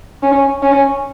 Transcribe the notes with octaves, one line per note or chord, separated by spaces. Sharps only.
C#4
C#4